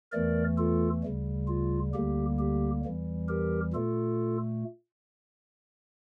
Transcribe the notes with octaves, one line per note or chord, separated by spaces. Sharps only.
E2 E3 A3 A#4 D5
F4 A4
D2 C#3 G3
F4
D2 D3 G3 A#3 G4
G4
E2 E3 G3
G4 A#4
A#2 A3 F4 A4